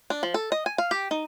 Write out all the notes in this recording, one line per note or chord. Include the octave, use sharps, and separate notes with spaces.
D4
F3
A4
D#5
G#5
F5
G4
D#4